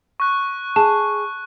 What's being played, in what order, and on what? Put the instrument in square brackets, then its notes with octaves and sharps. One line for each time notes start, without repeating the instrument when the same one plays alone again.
[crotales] C#6 F#6
[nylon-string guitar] G#4 [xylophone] A5